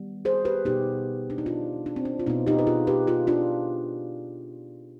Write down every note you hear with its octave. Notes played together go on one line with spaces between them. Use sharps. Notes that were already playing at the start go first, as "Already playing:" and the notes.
Already playing: D#3 G3 B3
G#4 C5
G4 B4
B2 B3 D#4 G4
D4
D#4
D4 F4
D4
C4
D4
F4
B2 B3 C4 D#4
D#4 G4
B4
F4 G#4
G4 B4
F4 G#4
D4 F4